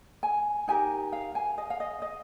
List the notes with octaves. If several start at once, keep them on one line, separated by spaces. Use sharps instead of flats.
G#5
D#4 G4 A#4 G#5
F5
G#5
D#5
F5
D#5
D#5